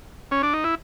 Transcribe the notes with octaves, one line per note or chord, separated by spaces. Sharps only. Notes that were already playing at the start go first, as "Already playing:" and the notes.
C#4
D4
D#4
E4